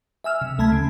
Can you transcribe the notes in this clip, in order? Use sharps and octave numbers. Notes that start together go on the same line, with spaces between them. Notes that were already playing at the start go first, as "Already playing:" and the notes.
E5 G#5 E6 F6
C3
D2 A3 A5 B5 G#6
C#3